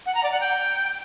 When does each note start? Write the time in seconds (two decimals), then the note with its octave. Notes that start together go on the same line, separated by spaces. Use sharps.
0.06 F#5
0.15 A#5
0.23 D5
0.32 F#5
0.41 G5